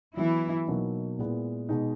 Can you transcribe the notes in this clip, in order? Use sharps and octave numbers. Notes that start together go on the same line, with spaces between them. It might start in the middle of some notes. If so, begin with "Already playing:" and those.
E3 F#3 B3 E4 F#4
B2 F#3 A#3 D#4
A#2 G#3 B3 E4
B2 G#3 D#4